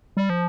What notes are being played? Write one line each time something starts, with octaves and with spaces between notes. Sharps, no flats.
G3
F3